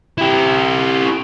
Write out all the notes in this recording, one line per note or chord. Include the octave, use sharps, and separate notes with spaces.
E4 G4